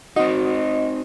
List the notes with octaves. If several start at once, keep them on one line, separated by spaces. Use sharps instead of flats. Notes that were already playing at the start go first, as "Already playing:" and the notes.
C4 D#4 F#4 D#5